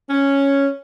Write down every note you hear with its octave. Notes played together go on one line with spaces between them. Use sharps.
C#4